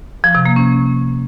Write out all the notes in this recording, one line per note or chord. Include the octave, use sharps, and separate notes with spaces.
F3
C3
A#3
C#4